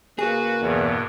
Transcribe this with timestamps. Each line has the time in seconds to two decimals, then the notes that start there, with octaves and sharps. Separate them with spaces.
0.19 C#2 A#3 F#4 G#4 B4
0.61 E2 G2 B2